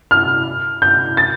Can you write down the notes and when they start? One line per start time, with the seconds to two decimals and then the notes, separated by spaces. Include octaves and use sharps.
0.11 F6
0.82 G6
1.17 A6